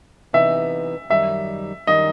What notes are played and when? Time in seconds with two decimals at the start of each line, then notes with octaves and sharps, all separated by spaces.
0.33 C3 E3 B3 D#4 E5
1.10 F#2 D#3 G3 D#4 E5
1.87 F#2 D#3 G3 D#4 D#5